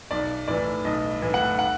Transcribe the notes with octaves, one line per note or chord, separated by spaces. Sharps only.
B1 D5
A2 E3 D5
B1 D#5
A2 E3
F#5
F#5